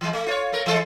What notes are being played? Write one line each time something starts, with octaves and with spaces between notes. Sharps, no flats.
E3 G#3
A3
F4 C5 C#5
A3 A#4
E3 G#3 A4